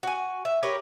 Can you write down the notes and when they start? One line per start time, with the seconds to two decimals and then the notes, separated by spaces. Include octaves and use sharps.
0.03 F#4 G#5
0.45 E5
0.63 G4 A#4 B4 C#5